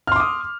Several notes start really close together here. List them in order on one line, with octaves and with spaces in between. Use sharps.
F6 C6 D6 D#6